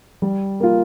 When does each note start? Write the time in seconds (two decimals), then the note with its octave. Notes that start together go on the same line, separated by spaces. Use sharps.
0.22 G3
0.60 A#3 F4